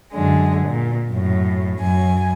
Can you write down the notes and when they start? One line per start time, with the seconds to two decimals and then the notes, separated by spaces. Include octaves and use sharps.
0.13 F#2 D3 G#3
0.66 A#2
1.10 F#2 A2
1.77 F#2 G#5